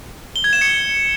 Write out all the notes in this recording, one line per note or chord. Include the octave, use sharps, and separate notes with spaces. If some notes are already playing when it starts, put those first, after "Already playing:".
G7
G#6
E7
C#7